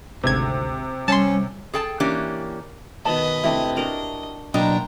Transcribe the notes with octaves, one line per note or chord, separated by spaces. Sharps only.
G#1 D2 C3 G#6
G3 C#4 A5 C6
G#4 A4 G5 A5
E3 A#3 C#4 D4 G4
B2 D#3 B4 D#5 A5 B5
C3 A3 D4 E4 G4
D4 F#4 A#4 D#5
B2 F#3 A#3 D4 C5 D#5 G5 A#5